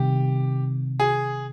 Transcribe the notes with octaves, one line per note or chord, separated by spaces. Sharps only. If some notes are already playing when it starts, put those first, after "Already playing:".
Already playing: C3 D#3 G3 G4
G#4